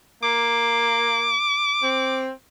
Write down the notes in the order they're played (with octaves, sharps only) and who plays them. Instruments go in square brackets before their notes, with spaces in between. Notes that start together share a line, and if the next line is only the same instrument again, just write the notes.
[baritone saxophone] A#3 [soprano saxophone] D6
[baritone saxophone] C4